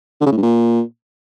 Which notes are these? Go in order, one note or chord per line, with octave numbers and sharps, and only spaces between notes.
D3
C#3
A2
G2
A#2